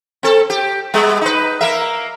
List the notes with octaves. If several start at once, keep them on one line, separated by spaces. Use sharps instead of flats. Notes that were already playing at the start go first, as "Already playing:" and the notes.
C4 A4
G4
G3 G#3 B3
D#4 B4
A#3 A#4 E5